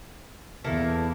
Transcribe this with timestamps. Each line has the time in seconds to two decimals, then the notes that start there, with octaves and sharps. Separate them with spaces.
0.64 E2 A#3 E4 A4